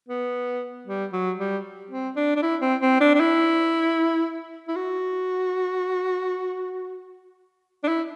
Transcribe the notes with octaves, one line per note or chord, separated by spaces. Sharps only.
B3
G3
F#3
G3
C4
D4
D4
E4
C4
C4
D4
D4
E4
E4
F#4
D4
E4